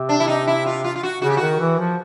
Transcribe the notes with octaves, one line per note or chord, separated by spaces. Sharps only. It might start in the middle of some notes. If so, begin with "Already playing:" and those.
Already playing: C3
D4
E4
D#4
E4
F4
F4
F4
F#4
C#3 F#4
G4
D#3 F#4
E3
F3